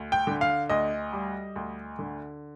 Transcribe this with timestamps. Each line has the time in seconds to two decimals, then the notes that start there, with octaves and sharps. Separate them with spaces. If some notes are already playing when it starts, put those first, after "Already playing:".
Already playing: D2
0.12 G5
0.27 D3
0.41 F5
0.69 D2 D#5
1.13 G3
1.56 D2
1.99 D3